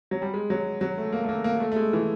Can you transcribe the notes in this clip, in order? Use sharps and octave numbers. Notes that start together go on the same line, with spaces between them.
F#3
G3
G#3
F#3
F#3
A3
A#3
A3
A#3
A#3
A3
A3
G#3
E3